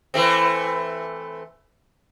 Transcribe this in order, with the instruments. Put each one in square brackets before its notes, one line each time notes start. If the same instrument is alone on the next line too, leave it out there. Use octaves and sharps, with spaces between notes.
[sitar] E3 A3 C4